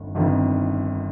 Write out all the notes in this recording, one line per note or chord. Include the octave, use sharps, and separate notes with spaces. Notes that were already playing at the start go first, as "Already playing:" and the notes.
Already playing: G1 F2 D#3
G1 F2 D#3